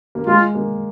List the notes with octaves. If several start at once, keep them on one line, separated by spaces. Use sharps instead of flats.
A#3
G#3 F4
A#3